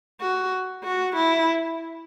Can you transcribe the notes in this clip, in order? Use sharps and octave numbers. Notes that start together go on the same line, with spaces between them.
F#4
F#4
E4